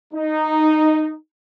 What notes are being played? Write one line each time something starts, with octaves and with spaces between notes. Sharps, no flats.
D#4